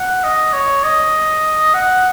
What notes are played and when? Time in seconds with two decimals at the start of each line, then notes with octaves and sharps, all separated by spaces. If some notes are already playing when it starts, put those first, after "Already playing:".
Already playing: F#5
0.23 D#5
0.53 C#5
0.84 D#5
1.74 F#5